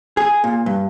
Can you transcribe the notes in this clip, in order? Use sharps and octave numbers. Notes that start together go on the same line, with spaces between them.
G#4
A#2
G2